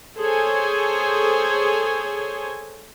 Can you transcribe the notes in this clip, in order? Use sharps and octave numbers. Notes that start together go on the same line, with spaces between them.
G#4 A4 C5 C#5 G#5